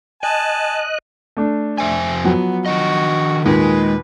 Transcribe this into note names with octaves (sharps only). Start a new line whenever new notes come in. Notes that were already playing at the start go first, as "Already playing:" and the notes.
D#5 G#5 A5 F#6
A3 D4
F2 C5 E5 G#5
F3 F#3 B3
D#3 D4 F#4 D#5
D#2 A#2 D#3 G#3 B4